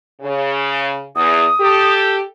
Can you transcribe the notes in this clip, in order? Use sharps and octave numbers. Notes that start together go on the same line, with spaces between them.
C#3
E2 D#6
G4 A4